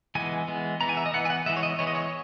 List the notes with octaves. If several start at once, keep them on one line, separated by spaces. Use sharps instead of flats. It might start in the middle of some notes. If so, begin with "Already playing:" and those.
E3 G#3 B3 G#5
E3 G#3 B3
E3 B3 A#5
G#5
E5
D#5
E3 B3 F#5
G#5
F#5
E3 G#3 B3 E5
C#5
D#5
E3 G#3 B3 C#5
D#5
C#5